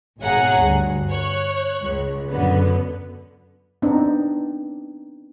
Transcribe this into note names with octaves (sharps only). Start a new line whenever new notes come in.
G#1 B2 G#4 C#5 F#5 A#5
D2 G2
C#5 F#6
C#2
F#2 D3 B3
B3 C4 D4 D#4